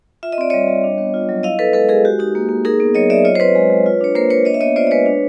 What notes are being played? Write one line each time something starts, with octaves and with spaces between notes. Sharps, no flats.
F4 E5
D#5
C4 D5
G3 C#5 D#5
G3
D4
B3
F4
F#3
E4 D#5 F5
B3 A4 B4
G#3 A4 B4
G#3 G#4 A#4
F#4 G4
D#4 G4
A#3
A#3
D#4 G#4 A#4
B3
F#3 C#5 D#5
F#3 D5 E5
F4 C#5 D#5
C5
C4 B4 C#5
G#3
G#3
F4
D4 C#5
A#3 A#4 C5
A#3 B4 C#5
D4 C#5 D#5
E5
B3 C#5 D#5
F4 C5 D5
D5
G#3 B4 C#5
D4